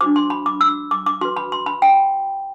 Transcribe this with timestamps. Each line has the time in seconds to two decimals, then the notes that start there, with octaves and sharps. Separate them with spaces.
0.01 D4 F#4 C5 D6
0.16 C6
0.30 B5
0.46 D6
0.61 E6
0.91 D6
1.06 D6
1.21 F#4 B4 C6
1.37 B5
1.52 C6
1.66 B5
1.82 G5